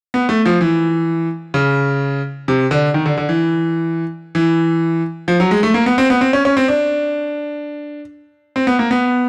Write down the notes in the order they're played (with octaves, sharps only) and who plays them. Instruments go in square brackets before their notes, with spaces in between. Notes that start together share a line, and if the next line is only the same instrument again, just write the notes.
[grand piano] B3
A3
F3
E3
C#3
C3
D3
D#3
D3
D3
E3
E3
F3
F#3
G#3
A3
A#3
B3
C4
B3
C4
C#4
C#4
C4
D4
C4
B3
A#3
B3